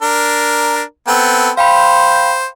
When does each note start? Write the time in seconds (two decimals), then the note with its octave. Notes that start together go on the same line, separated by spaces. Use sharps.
0.02 D4 A#4
1.08 B3 C4 A4
1.57 C5 F5 G5 B5